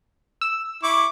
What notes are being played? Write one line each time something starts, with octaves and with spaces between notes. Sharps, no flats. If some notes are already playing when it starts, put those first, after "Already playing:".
E6
E4 C#6 D6